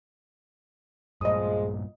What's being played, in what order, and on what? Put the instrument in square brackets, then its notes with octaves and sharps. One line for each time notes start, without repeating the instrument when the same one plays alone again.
[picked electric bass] G2 A#2 [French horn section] F3 G#3 [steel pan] D#5 D#6